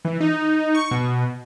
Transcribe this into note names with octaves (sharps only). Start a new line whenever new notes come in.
E3
D#4
C#6
B2